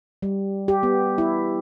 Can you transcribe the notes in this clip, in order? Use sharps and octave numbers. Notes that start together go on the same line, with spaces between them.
G3
G4
B3
E4